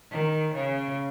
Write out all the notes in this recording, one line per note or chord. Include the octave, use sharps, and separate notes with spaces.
D#3
C#3